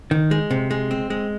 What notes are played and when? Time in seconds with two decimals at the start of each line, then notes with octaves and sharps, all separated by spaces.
0.11 D#3
0.31 G#3
0.51 C3
0.71 G#3
0.91 C4
1.10 G#3